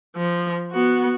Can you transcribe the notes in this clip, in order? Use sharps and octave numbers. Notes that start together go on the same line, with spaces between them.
F3
B3 F#4